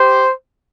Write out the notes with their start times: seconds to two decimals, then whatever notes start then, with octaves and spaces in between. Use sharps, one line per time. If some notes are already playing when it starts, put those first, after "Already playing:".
Already playing: G4 C5